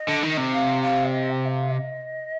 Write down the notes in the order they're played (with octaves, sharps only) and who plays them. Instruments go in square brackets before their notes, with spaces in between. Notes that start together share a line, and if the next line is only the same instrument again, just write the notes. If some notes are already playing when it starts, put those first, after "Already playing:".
Already playing: [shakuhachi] D#5
[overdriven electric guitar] D3
D#3
C3
[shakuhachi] F5
F5
D5
D#5
G5
D#5
F5
D#5